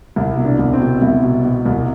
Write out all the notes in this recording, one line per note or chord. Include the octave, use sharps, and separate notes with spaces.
C2 E4
B2
D4
C2
C4
B2
C2 E4
B2
B2
C2